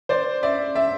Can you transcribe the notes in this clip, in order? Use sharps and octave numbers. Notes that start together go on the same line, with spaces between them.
C5 D5
D5 E5
D5 E5